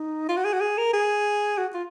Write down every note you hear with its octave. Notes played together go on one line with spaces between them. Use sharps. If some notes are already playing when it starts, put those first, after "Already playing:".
Already playing: D#4
F4
F#4
G#4
F#4
G#4
A#4
G#4
F#4
F4